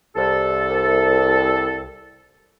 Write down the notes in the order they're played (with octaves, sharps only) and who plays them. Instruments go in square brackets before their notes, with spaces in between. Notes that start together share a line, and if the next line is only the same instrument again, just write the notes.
[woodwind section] C2 A4